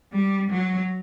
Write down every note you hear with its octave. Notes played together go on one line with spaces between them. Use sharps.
G3
F#3